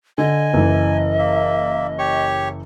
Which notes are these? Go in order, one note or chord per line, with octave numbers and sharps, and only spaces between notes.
D3 D#5 G#5
F#1 E3
A#3 E5
G4 C#5 C#6